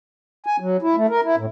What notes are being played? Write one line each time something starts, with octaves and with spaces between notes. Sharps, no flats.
G#5
F#3
E4
A3
A#4
E4
A2